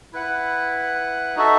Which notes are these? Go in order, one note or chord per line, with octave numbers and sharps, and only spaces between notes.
E4 B4 F#5
D#4 F#4 A4 E5